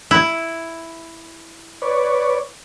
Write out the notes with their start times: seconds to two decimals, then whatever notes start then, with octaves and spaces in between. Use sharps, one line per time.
0.11 E4
1.82 B4 C#5 D5